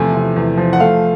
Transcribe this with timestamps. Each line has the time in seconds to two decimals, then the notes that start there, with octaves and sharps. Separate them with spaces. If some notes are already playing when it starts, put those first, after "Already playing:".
Already playing: E2 C3 F3 A3 G#5
0.14 C3
0.36 E2
0.57 F3
0.73 F#5
0.80 A3 F5